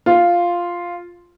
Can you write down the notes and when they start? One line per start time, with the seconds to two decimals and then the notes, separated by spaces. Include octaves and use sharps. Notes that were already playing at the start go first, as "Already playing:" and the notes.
0.06 F4